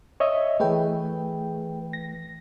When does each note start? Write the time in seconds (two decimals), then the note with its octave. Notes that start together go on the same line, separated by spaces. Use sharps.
0.20 C#5 D#5 E5
0.60 E3 A3 G#4 B4 G5
1.93 A#6